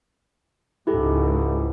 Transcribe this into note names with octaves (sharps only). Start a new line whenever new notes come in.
C#2 G#2 E4 G4 A4